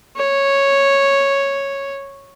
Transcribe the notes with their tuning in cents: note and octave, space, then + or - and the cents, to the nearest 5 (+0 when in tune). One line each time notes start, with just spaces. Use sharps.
C#5 -5